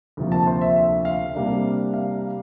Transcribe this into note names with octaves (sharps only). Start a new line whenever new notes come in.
D2 C3 F3 A#3
A5
C5
E5
E5
F5
C3 G3 A#3 D4
F5